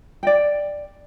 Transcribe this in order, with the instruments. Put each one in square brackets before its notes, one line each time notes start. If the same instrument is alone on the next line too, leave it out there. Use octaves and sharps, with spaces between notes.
[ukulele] D5 D#5 G5